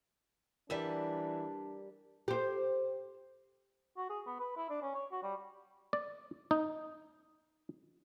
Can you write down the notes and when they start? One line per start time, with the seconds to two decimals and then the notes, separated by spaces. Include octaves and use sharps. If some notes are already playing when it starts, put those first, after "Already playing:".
0.70 E3 G3 D4 A#4 D5 E5
2.28 G4 C5
3.97 F#4
4.10 G#4
4.27 B3
4.40 B4
4.57 E4
4.70 D4
4.82 C#4
4.95 C#5
5.12 F#4
5.23 G3
5.93 D5
6.51 D#4